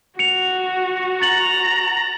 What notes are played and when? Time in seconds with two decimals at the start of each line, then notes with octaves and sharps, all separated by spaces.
0.19 F#4 C#7 F7
1.22 A#5 A6 F#7